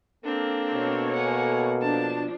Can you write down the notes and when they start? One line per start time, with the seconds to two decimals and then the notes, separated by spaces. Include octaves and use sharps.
0.24 A#3 C4 D4 A4
0.73 B2 C#5
1.14 F#5 G#5
1.82 F3 D4 A5